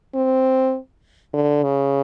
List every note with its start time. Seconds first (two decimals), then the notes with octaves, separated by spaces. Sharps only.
0.15 C4
1.33 D3
1.63 C#3